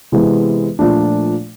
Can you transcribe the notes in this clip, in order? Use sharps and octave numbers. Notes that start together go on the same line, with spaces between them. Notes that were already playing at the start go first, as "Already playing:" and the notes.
C3 E3 G#3 B3 E4
A#2 F3 A3 D4